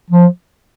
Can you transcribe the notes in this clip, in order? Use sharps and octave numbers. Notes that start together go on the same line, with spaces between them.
F3